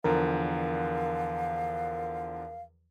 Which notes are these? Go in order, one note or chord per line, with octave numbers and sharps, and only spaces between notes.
E2 D3 F3 A#4 F5